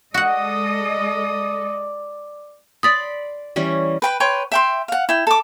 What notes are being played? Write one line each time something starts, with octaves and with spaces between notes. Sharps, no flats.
G#3 F#4 A4 D5 D#5 F#5 D#6
D5 B5 C6 D#6 A6
E3 G3 C#4
B4 G5 B5
B4 C#5 G5 C6
E5 G5 C6
F5 F#5
E4 G5
A4 D6